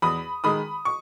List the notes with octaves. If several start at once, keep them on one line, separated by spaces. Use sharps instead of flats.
E2 B5 D#6
D#3 G#3 B5 D#6
C#6